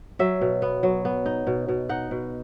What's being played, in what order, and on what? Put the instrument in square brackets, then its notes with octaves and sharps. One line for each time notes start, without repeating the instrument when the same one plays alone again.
[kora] F#3 E5
B2
B3
F#3
B3
D#4
B2
B2
D#4 F#5
B2